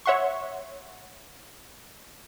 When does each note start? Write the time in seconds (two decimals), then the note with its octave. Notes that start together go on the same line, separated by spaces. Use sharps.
0.06 C#5 E5 F#5 C6 C#6